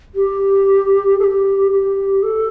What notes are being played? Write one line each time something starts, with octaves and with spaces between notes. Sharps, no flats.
G4
A4
G4
G4
A4